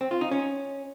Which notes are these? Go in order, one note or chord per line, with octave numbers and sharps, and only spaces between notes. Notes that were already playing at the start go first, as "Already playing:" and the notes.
C4
F4
D#4
C#4